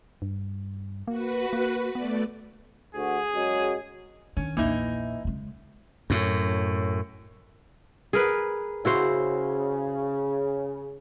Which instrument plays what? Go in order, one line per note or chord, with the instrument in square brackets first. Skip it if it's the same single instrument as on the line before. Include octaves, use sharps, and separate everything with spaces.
[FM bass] G2
[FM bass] A#3 [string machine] F#4 B4
[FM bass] A#3
[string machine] A3 D5 [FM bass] B3
[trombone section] D2 F#4 [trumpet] G#4
[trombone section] F#2 F#3 G#3
[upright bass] D#3 [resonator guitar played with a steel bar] C#4
[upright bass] A#1 E2 [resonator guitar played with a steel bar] E3 D#4 [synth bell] A#3 E5
[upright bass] C#3 G#3
[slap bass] F#2 A2
[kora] G#4 A#4 B4
[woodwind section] C#3 [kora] E4 F#4 C5